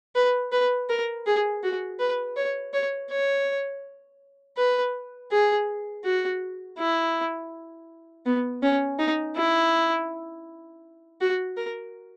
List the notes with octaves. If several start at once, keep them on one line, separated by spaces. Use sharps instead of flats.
B4
B4
A#4
G#4
F#4
B4
C#5
C#5
C#5
B4
G#4
F#4
E4
B3
C#4
D#4
E4
F#4
A#4